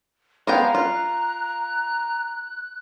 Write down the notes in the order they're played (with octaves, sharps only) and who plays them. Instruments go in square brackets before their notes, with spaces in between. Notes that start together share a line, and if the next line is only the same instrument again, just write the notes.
[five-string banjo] G#3 B3 G5 [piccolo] F5 [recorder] A#5
[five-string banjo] F4 [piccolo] F#6